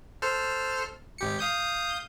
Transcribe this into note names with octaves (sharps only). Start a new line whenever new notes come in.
A4 C5 F6
G#1 G4 C#7
F5 D#6 G6